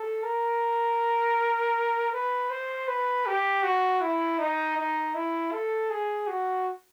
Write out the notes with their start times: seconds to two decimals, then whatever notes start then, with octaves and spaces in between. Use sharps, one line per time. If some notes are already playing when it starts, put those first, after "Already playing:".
Already playing: A4
0.23 A#4
2.13 B4
2.50 C5
2.88 B4
3.26 G4
3.63 F#4
4.01 E4
4.39 D#4
4.77 D#4
5.15 E4
5.52 A4
5.90 G#4
6.28 F#4